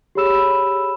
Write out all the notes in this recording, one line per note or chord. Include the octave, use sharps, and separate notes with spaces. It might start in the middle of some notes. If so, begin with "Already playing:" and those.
G4 G#4 C#5 B5 E6 E7